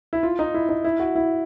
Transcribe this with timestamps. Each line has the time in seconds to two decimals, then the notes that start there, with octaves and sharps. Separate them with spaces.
0.13 E4
0.23 F4
0.39 D#4
0.54 E4
0.69 D#4
0.84 E4
1.00 F#4
1.15 E4